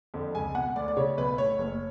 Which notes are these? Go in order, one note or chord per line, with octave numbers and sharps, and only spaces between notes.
F2 D3
C#2 G#5
B2 F#5
D2 D5
D5
C#3 C#5
B1 B4
A2 C#5
F#1